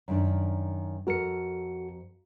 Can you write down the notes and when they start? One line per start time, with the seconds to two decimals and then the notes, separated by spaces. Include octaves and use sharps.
0.08 F#2 D#3 D4
1.07 F2 F#4 A4 A#4 C#7